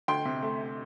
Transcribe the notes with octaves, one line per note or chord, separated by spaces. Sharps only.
D2 G5 C6
C3
A3